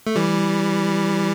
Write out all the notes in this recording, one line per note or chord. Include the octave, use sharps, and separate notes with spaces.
A3
E3 G3